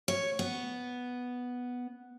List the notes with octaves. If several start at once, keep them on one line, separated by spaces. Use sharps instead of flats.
C#5
B3